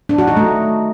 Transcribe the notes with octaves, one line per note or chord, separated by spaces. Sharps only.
D4
F#4
D#4
A3